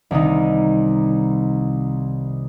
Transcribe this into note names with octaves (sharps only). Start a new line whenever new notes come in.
C2 C3 D#3 D#4